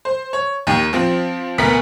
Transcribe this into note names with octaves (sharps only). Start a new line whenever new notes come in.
C5
C#5
D#2 D#3
F3 C4
D2 B2 B3 A#4 B6 C#7